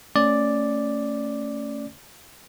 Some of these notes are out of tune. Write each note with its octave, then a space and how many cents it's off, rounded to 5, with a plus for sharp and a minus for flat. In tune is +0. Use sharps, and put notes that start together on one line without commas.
A3 +25 C#4 +0 D5 +0